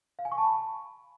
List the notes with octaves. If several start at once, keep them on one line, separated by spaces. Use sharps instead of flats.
F5
G#5
C#6
A5
B5